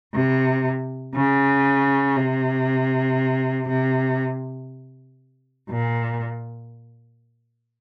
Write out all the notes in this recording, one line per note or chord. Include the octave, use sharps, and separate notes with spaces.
C3
C#3
C3
C3
A#2